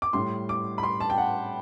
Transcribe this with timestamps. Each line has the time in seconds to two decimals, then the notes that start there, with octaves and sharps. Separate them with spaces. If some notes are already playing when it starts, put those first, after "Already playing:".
0.02 D6
0.13 A2 G3 C6
0.49 D6
0.78 B5
0.83 C6
1.00 A5
1.10 G5
1.18 F#5